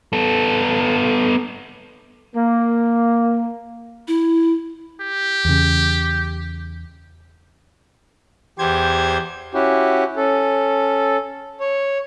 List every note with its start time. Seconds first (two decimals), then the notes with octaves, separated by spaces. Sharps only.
0.13 B3 A4
2.36 A#3
4.08 E4
5.00 G4
5.45 E2 C#3
8.59 E2 G4 C5 G#6
9.54 C#4 E4 F#4 G4
10.16 C#4 A4
11.60 C#5